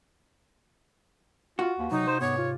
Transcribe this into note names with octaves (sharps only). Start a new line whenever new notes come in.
F4 F#4
D#2 F4 B4
C3 F#3 D#4
C5
G#2 B3 C#5 D6
F4